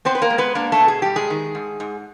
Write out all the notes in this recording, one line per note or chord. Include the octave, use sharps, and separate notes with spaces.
B3 C4 C5
B4
A#3 A#4
G#3
B3 B4
A#3 D4 A#4
A3 A4
B2
G#4
G3 G4
G#3 G#4
D#3
G#2
G#2